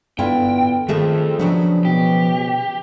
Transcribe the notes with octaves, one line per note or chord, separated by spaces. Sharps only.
G2 D3 B3 E4 F4 G5
F2 D#3 A3 G#4 A4 E5
C#3 F3 F#3 B3 D4
B2 G4